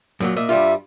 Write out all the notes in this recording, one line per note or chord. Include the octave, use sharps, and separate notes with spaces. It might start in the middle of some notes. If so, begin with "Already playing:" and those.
F#2 A#2 F#3
A#2 D#5 E5
G2 G3 F4 E5